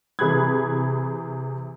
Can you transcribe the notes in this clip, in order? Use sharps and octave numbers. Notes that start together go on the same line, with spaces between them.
C3 E3 G#4 B5 F#6 G#6